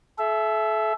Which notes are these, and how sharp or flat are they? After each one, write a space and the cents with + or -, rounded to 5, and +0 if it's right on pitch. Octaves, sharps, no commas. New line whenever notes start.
A4 -40 E5 +10